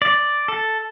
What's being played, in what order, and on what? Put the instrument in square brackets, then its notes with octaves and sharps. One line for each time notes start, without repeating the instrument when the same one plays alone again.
[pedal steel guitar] D5
A4